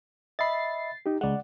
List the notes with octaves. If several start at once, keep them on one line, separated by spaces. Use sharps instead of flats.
D#5 E5 B5 A6 C7
D#4 G4
C#2 G#3 D5 F#5